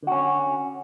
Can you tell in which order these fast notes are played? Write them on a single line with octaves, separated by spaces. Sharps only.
D3 F#4 C#4